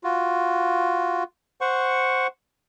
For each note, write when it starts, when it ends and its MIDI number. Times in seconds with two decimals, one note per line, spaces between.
0.04 1.23 65
0.04 1.23 66
1.61 2.27 72
1.61 2.27 78
1.61 2.27 85